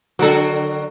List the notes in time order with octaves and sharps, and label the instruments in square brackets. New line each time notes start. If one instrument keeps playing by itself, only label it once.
[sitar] D3 F#4 A#4 [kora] F#3 A4